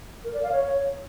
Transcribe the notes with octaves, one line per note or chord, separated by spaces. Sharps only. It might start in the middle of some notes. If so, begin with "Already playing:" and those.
A#4
D5
F5
C#5